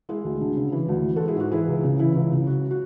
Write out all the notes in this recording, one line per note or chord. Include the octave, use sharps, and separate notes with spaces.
G#3 E4 G#4
D2
D3
C#3
E3
D2
E3
F#4 A4
G#3
E4 G#4
G#2 F#4
E3 E4 G#4
C#2
C#3
E3 E4
C#2
C#3
F#3 F#4
F#4